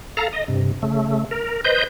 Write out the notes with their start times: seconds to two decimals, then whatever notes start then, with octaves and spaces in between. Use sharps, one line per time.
0.17 A4 F5 A#5
0.33 D#5
0.48 G2 C3
0.82 C#3 A3
1.31 A#4
1.64 B4 C5 D#5 G6